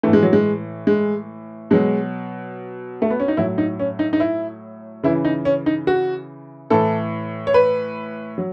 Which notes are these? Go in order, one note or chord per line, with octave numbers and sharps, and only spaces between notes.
A2 E3 A3
G#3
F#3
G#3
G#3
B2 F#3 G#3
A3
B3
C#4
D#4
A2 F#3 E4
D#4
C#4
D#4
D#4
E4
C#3 E3 E4
D#4
C#4
D#4
F#4
A2 E3 A4
C#5
B4
F#3